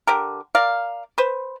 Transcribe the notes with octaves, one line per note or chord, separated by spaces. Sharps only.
D3 G4 A#4
A#4 D5 F5
B4 C5